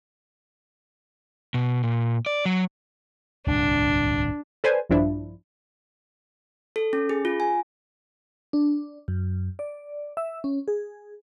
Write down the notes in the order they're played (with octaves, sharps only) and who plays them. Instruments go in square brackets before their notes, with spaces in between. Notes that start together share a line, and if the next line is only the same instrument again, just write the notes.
[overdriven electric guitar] B2
A#2
D5
F#3
[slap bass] D1 C2 G2 [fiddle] D4
[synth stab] A4 B4 C5 D5 G#5
A#1 G2 F3 D4 E4
[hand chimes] A4
C#4
G#4
F4
G#5
[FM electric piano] D4
F#2
D5
E5
C#4
G#4